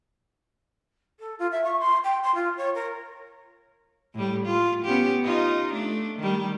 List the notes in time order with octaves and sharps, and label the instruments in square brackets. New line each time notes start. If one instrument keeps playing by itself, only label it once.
[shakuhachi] A4
F4
E5
C#6
C6
G5
C6
F4
C#5
A#4
[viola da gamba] A2 G3
F4
B3 C#4 G4
D#4 F4 D#5
A3 D4
D#3 G3